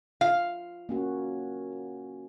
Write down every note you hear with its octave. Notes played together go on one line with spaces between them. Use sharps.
F4 F5
A#3 C#4 F#4